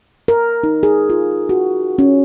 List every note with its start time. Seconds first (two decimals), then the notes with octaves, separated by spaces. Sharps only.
0.28 A#4
0.63 D#4
0.83 G#4
1.10 F4
1.49 F#4
1.99 C#4